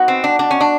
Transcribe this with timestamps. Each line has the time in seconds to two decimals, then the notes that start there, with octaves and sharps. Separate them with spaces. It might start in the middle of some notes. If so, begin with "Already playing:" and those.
Already playing: B3 D#4 F#4 B4
0.08 C4
0.24 D4
0.39 D4
0.51 C#4
0.61 D4